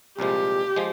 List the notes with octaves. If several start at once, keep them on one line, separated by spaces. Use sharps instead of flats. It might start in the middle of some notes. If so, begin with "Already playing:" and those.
C2 A#2 F3 G#3 G4
F3 G#3